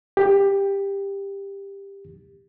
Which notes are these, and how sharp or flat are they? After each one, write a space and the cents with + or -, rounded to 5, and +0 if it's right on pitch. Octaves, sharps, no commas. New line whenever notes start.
G4 +15